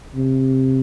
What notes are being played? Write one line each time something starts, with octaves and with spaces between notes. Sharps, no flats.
C3